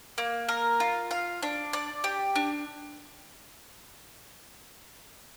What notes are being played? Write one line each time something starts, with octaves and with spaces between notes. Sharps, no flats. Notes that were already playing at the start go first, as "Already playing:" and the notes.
A#3
A#4
F4
F5
D4
D5
G4
D4